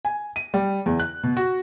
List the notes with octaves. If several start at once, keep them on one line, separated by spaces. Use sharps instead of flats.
G#5
D#7
G3
E2
F#6
B2
F#4